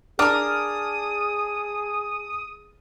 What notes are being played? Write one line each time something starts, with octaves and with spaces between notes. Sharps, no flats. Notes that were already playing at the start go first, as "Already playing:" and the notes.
D4 G#4 A#4 A5 D6 D#6 F6